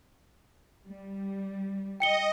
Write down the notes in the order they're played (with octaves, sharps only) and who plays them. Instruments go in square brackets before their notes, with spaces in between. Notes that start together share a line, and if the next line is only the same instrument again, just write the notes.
[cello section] G3
[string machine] D#5 [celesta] G5 C#7 G7